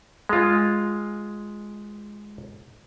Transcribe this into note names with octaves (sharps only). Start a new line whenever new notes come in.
G#3 F4